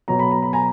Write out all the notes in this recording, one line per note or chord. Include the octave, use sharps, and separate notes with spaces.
B2 F#3 A#5
B5
A#5
B5
G#5 A#5